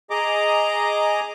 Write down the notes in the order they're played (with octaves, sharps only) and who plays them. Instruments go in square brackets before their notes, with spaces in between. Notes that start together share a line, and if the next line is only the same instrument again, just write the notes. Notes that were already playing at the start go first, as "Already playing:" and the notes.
[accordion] G#4 D#5 A#5 D6